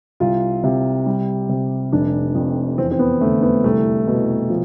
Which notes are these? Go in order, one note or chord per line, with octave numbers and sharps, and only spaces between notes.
C2 F4
C3
G3
C3
F1 D4
F2
E2 C4
C4
B3
D3 A3
B3
C2 A3
B2
F3